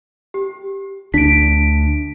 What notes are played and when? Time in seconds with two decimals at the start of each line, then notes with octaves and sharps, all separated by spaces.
0.34 G4
1.14 D2 D4 B6 D7